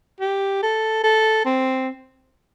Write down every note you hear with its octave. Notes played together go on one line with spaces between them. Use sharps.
G4
A4
A4
C4